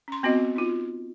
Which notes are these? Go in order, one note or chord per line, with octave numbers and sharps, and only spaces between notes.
C#4 C6
B3 C4 F#4 D#5
D#4 F4